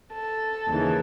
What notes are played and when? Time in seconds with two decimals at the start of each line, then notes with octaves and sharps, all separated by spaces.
0.12 A4
0.67 D#2 C#3 E3